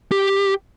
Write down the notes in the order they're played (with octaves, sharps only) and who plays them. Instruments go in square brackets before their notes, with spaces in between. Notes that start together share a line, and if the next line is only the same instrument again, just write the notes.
[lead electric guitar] G4